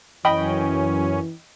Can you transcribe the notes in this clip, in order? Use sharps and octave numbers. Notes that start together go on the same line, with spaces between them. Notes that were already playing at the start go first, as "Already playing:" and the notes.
F#2 E3 C#4 D#5 G5 B5